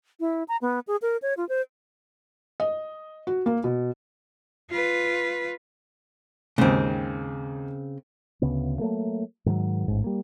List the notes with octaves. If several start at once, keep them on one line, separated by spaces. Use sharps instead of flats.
E4
A#5
B3
G#4
A#4
C#5
F4
C5
D#5
F#4
A#3
B2
F4 B4
D#2 G#2 C#3 C4
D2 C#3 B3
F#3 A3 A#3
G#2 D#3 E3 F#3
A1 G#2
G3 A#3